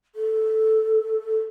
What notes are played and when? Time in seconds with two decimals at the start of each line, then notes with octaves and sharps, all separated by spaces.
0.15 A4